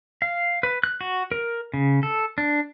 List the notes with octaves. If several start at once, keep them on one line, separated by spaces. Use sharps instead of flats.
F5
B4
F#6
F#4
A#4
C#3
A4
D4